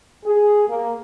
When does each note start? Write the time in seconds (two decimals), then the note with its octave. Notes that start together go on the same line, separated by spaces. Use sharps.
0.24 G#4
0.68 A#3